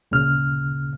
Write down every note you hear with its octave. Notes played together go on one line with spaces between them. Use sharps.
D2 A#2 C#3 F6